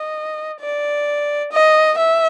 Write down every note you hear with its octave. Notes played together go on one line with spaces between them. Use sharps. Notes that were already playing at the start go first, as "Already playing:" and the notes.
Already playing: D#5
D5
D#5
E5